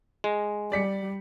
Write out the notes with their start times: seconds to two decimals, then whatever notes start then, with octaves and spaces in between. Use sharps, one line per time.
0.24 G#3
0.72 G3 D5 B6 C#7